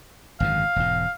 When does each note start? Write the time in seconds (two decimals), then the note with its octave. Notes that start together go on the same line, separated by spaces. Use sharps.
0.40 G#1 F#2 D3 F5
0.76 E1 G#2